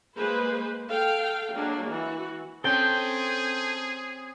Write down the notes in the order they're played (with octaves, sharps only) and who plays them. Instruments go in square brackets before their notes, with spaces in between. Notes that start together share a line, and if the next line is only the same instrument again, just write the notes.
[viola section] G#3 A#3 G#4 B4 C5
A4 F5 G5
F#3 G#3 A#3 D4
E3 F#4
[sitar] C4 C#4 [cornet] G#4 [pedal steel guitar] A4 G5